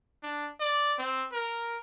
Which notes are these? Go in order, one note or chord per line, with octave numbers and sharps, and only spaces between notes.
D4
D5
C4
A#4